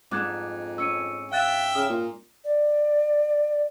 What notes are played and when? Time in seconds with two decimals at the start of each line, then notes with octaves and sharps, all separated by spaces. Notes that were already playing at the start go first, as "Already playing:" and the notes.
0.11 F2 G#2 D4 D6 F#6 G#6
0.78 C#4 E6 C#7 D#7
1.32 E5 F5 G5 F#6 A6
1.75 C#3 D#6 F6 E7
1.89 A#2
2.44 D5